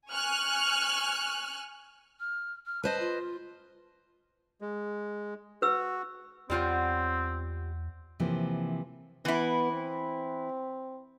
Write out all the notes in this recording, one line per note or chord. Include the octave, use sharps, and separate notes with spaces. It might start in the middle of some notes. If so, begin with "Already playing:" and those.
G#5 C#6 F6 F#6
F6
F6
B4 C5 D#5 A5
F4
G#3
F#4 B4 E6
E2 G3 C4 F4 C5 C#5 F#5 G5
C3 E3 F3 A#3
E3 B3 E4
C4